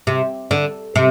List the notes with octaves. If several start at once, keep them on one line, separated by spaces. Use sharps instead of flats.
C3
D3
C3